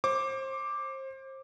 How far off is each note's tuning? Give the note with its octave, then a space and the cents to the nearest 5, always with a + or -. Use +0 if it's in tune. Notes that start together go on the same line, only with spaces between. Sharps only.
C5 +30 D6 +0